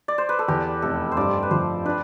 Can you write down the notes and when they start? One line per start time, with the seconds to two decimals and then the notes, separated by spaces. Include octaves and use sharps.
0.08 D5
0.18 C5
0.29 B4
0.39 A4
0.48 E2 G4
0.82 F1 A4
1.12 C5
1.17 G2 D5
1.43 B4
1.51 F3 C5
1.85 D4 B4